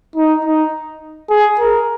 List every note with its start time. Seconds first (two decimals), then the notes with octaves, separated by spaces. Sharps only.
0.16 D#4
0.45 D#4
1.30 G#4
1.59 A#4